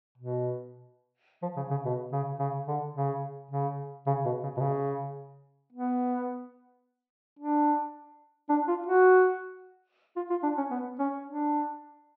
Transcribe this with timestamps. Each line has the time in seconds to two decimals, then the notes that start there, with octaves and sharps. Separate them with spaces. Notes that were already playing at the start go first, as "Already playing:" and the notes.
0.18 B2
1.42 F3
1.57 C#3
1.71 C#3
1.85 B2
2.12 C#3
2.39 C#3
2.68 D3
2.95 C#3
3.51 C#3
4.07 C#3
4.25 B2
4.43 C#3
4.57 B2
4.61 C#3
5.73 B3
7.39 D4
8.49 D4
8.68 F4
8.87 F#4
10.16 F4
10.30 F4
10.43 D4
10.58 C#4
10.71 B3
10.99 C#4
11.27 D4